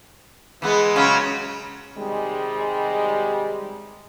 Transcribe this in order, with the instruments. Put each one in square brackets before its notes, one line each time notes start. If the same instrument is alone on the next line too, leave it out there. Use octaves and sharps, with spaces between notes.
[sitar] E3 B3 [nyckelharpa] G#3
[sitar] C#3 F#3 C#4
[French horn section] C3 D#3 G3 G#3